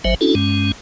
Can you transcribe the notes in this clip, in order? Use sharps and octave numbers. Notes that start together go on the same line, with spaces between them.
G#1 F#3 C5 E5
C#4 D4 E4 F#4 A4
G2 G#3 C#4